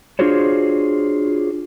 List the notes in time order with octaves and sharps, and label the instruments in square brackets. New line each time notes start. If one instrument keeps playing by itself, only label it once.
[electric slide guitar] D4 F4 F#4 G#4 C5 C#5